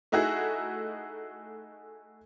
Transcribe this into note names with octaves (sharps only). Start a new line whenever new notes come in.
A3 D#4 E4 F#4 G#4